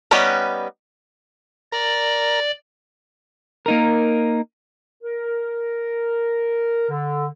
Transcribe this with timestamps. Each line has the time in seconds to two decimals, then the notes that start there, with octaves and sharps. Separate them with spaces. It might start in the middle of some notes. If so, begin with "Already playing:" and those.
0.11 G3 B3 C#4 D#4 G4
1.72 A#4 D5
3.66 A#3 D#4 A#4
5.03 A#4
6.89 D3